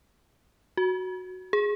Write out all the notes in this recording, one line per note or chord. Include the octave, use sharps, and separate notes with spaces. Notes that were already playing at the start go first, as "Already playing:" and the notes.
F#4
G#4